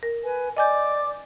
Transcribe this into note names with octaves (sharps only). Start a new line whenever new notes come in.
A#4
B4 G#5
D5 D#5 G#5 D6 G6